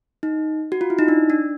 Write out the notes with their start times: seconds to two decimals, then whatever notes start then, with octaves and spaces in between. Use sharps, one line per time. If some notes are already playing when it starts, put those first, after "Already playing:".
0.23 D#4
0.72 F#4
0.81 F4
0.90 E4
0.99 D#4
1.08 D4
1.30 D4